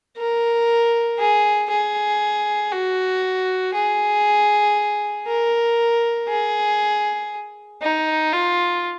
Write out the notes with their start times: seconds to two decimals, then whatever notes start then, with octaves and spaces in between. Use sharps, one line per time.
0.17 A#4
1.19 G#4
1.70 G#4
2.72 F#4
3.74 G#4
5.27 A#4
6.29 G#4
7.82 D#4
8.33 F4